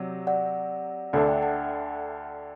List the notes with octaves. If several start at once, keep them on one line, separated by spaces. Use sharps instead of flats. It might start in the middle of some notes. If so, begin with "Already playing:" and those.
Already playing: C3 F#3 D5 F#5
D5 F#5
D2 D3 A3 D4 D5 F#5
E5 G5
F#5 A5